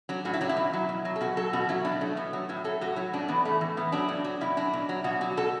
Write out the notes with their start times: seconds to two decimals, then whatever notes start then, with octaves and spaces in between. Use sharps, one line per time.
0.09 F#3 D4
0.25 A2 F#4
0.34 E4
0.41 F#3 D4
0.49 E4
0.57 B2
0.74 F#3
0.89 B2
1.05 F#3
1.16 A4
1.21 B2 F#4
1.37 F#3 A4
1.53 B2 F#4
1.69 F#3 E4
1.85 B2 D4
2.01 F#3 A3
2.17 B2 B3
2.33 F#3
2.49 A2 E4
2.64 F#3 A4
2.81 A2 F#4
2.96 F#3 E4
3.13 A2 D4
3.28 E3 B3
3.45 A2 A3
3.61 E3
3.77 A2 B3
3.92 F#3 D4
4.09 A2
4.24 F#3
4.41 B2 E4
4.57 F#3 D4
4.73 B2
4.89 F#3
5.04 B2 F#4
5.21 F#3 F#4
5.37 B2 A4